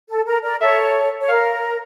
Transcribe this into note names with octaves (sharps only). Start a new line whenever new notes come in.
A4
A#4
A#4 D5
A4 C#5 E5
C#5
A#4 F5